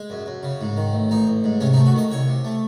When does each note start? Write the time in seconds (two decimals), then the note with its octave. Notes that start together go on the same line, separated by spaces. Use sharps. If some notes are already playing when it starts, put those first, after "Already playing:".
Already playing: G#3
0.10 F#2
0.26 F#2
0.43 C#3
0.61 G#2
0.77 D#3
0.93 A1
1.10 A1 D#4
1.27 A1
1.44 G#2
1.61 C3 C#4
1.73 D#4
1.77 A3
1.86 F#4
1.94 D#3 D#5
2.11 C2 C#5
2.28 C3
2.45 A3